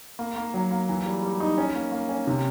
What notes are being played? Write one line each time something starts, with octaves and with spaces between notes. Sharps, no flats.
A#3
A#3
F#3
A#3
E3
G3
G3
D#4
C#4
A#3
A#3
C#4
C3